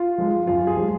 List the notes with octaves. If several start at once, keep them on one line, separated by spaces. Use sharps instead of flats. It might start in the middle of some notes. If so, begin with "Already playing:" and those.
Already playing: F4
F3 G#3
F#2 F4
G#4
F3 G#3